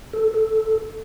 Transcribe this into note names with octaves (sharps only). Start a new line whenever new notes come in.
A4
A4